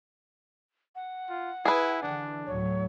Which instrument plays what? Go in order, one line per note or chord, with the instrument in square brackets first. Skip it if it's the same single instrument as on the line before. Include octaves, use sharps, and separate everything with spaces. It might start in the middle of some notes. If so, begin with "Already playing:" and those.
[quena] F#5
[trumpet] F4
[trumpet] E4 [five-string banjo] G#4 B4
[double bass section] D3 E3 [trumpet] D4
[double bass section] D2 A2 F#3 [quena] C#5